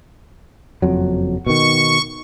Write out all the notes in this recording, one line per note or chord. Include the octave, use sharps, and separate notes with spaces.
F#1 F2 F#3
B2 D#3 C#6